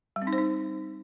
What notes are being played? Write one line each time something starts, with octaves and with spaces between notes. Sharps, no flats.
G3
C4
D#4
C5
D#4